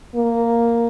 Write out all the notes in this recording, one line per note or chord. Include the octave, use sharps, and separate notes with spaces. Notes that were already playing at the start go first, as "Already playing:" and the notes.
A#3